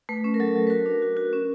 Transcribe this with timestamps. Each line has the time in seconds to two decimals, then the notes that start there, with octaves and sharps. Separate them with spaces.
0.09 A3 B4
0.24 C#4
0.34 A#4
0.40 F#3 A4
0.56 F#3
0.67 B4
0.70 F#4 A#4
0.86 D4
1.02 F#4
1.17 F#4
1.33 C#4